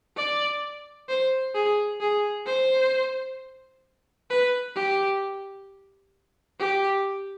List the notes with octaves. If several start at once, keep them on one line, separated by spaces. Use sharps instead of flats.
D5
C5
G#4
G#4
C5
B4
G4
G4